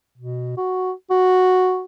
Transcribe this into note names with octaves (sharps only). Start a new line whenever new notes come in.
B2
F#4
F#4